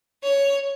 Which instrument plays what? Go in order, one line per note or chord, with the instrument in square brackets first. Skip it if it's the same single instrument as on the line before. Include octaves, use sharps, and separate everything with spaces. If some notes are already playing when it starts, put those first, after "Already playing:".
[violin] C#5